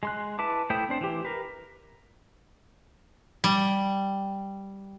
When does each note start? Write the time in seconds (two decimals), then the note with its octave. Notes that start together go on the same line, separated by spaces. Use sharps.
0.03 G#3 C6 F#6
0.39 E4 B4 E5 A5 D6
0.70 A3 E4 C5 G5 D#6
0.89 C4 D4 C5
1.01 E3 G4
1.25 A#4 B4
3.44 G3